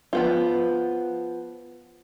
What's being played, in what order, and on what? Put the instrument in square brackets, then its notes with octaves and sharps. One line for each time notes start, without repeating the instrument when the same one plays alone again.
[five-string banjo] F3 B3 F4